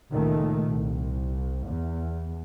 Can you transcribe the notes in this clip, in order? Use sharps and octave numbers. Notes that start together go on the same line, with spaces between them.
C#2 A#2 D#3 A3
C2
E2